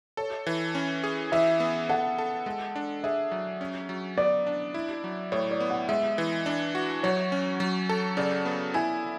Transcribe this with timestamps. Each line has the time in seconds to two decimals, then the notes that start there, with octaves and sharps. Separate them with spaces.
0.17 A4 C#5
0.47 E3
0.75 C#4
1.04 G#4
1.32 E3 E5
1.60 B3
1.89 A4 F#5
2.18 A4
2.46 G#3
2.76 D4
3.04 G#4 E5
3.31 F#3
3.61 C#4
3.89 F#3
4.17 B3 D5
4.47 D4
4.74 E4
5.04 F#3
5.32 A2 C#5
5.51 D5
5.60 B3
5.70 F#5
5.89 G#3 E5
6.18 E3
6.46 D4
6.75 F#4
7.03 F#3 C#5
7.32 C#4
7.60 F#3
7.89 A4
8.17 C#3 D5
8.45 B3
8.74 E4 G#5